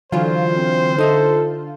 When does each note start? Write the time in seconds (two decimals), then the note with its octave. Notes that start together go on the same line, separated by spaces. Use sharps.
0.12 D3 E3 F#3 F4 C5
0.54 C4
0.98 D#4 A4 D#5 E5